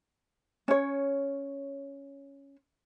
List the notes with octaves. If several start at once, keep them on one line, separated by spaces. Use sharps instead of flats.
C#4 C#5